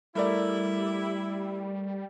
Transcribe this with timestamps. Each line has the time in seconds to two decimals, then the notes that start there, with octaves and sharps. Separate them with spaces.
0.15 G3 A3 E4 A#4 D5